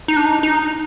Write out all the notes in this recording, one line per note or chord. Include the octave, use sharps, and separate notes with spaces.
D#4
D4
D#4
D#4